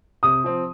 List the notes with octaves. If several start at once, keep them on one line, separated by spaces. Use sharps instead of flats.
C3 D#6
F3 C4